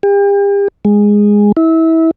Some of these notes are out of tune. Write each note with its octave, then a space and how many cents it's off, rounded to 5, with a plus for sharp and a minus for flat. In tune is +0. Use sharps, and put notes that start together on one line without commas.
G4 +40
G#3 -10
E4 -25